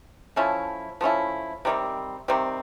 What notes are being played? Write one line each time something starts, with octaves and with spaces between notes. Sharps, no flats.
F3 A3 C#4 E4
F3 A3 C#4 E4
C3 D#3 G3 C4
C3 D#3 G3 C4